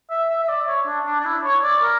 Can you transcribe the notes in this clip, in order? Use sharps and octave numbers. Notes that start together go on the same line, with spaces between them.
E5
E5
E5
D5
C#5
D4
D4
D4
E4
C#5
D5
A#4